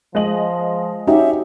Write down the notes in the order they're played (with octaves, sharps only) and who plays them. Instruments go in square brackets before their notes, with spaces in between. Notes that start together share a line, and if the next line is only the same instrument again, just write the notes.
[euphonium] F3 [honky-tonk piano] G#3 D#5 F#7
[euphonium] C#4 [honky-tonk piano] D#4 [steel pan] F#4 G4 [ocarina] E5